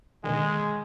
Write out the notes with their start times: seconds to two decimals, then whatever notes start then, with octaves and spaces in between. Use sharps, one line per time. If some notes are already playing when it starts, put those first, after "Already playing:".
0.24 B2 D3 D#3 G#3